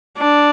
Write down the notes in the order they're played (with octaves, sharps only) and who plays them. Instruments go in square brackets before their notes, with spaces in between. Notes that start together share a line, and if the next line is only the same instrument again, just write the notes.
[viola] D4